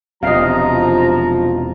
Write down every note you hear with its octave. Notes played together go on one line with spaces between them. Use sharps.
E1 C3 F3 D#5 F5 A#5